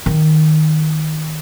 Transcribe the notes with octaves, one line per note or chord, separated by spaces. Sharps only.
D#3